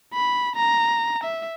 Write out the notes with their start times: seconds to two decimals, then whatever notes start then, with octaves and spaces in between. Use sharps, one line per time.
0.14 B5
0.56 A#5
1.24 E5